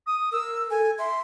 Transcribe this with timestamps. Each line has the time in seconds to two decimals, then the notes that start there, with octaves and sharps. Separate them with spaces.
0.06 D#6
0.32 A#4 E6
0.70 A4 G#5
0.99 E5 C6